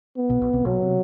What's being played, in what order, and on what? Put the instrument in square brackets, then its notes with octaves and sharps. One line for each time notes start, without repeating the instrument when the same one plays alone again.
[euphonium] B3
[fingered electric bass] B1 B2
B1 B2
C2 C3
[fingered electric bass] B1 B2 [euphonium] F#3
[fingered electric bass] C3